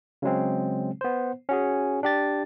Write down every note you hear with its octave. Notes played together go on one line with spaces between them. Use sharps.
C#3 F#3 G#3 C4
B3 C5
C#4 F#4 G#4
D4 G4 A6